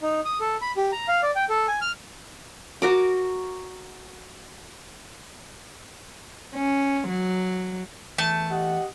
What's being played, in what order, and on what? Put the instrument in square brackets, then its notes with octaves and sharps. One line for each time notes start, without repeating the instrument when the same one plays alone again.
[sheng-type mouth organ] D#4
D#6
A4
B5
G4
A#5
F5
D5
G5
A4
G#5
F6
[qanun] F#4 A#4 D6
[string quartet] C#4
F#3
[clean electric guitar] E2 [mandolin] A3 A5
[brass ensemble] G4 D#5 F#5